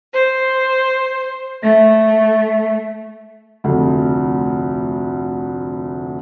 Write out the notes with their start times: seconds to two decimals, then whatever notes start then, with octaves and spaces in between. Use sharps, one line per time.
0.13 C5
1.60 A3
3.64 F1 D2